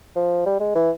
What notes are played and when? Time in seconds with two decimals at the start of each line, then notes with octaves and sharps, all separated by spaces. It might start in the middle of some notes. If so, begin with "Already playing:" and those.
0.16 F3
0.46 G3
0.60 G#3
0.75 E3